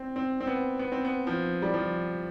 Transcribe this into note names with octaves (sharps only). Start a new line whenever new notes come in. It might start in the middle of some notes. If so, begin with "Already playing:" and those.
Already playing: C4
C4
C4
B3
B3
C4
B3
F3
G3
F3